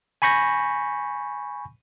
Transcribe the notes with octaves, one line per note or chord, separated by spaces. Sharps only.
G#5 B5 C#6 G6 A#6